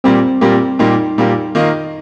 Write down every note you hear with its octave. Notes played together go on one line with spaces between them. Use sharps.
A#2 G3 A#3 C4 G4
A#2 G3 A#3 G4
A#2 G3 A#3 D#4 G4
A#2 G3 A#3 G4
D#3 A#3 F4 D#5